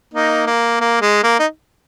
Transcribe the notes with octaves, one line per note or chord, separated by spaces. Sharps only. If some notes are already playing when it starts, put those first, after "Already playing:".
A#3 D#4
A#3
A#3
G#3
A#3
D#4